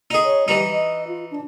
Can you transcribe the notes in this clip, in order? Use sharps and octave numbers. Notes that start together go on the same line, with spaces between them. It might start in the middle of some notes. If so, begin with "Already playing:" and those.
D#4 G#4
C#5
E3 G3 D#4
D#5
F4
D4